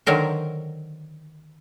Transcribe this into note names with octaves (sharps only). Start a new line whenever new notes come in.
D3 D#3 F#3 A#4 C5